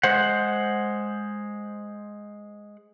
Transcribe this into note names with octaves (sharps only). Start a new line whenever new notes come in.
G#3 C5 F#5